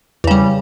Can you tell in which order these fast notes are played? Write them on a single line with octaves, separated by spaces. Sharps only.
E2 C#3 G3